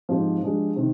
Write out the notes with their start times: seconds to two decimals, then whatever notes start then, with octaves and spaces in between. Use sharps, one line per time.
0.09 G#2 F3 C4 G4 C5
0.42 F3 G#3 D4 G4
0.76 C3 D#3